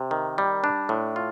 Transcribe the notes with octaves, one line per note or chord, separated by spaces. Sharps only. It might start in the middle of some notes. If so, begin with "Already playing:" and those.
Already playing: C3
D#3
G3
D4
A2
F4